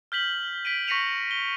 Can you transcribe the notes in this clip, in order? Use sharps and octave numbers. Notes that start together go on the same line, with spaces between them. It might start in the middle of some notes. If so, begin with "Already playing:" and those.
F6 G6 B6 F#7 G7
B6 D7 D#7
C#6 A#6 B6 C#7 D#7 F7
G7